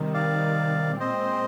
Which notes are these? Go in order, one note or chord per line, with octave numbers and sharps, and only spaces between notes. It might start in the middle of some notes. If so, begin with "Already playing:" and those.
Already playing: C3 D#3 G3
D5 F5
A#2 G#3 C4 C5 D#5